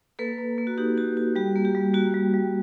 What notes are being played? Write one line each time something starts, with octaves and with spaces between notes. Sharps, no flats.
A#3 A4 B4
A#3
A#3
F#4
D#4 G4
F#4 G4
F#4
G3 G4
A#3
G4
G3
A#3 F#4
G3
G3